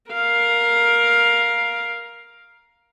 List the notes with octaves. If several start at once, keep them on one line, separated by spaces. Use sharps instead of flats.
A#4 F5